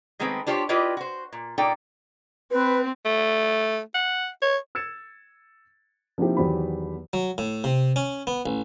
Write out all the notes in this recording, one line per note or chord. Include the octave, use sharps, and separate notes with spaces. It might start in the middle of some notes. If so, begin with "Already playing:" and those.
D#3 G#3 A3 B3 C4
D4 F4 G4 C5 C#5
E4 F4 G4 B4 D5 D#5
F#4 C5
A#2
A#2 D#4 A4 D5 G5
C4 B4
A3
F#5
C#5
E6 G#6 A6 C#7 E7
F3 A#3 C4 D#4 E4 G4
E2 D#3 F#3 G4 C5 B5
F#3
A2
C3
C#4
B3
A1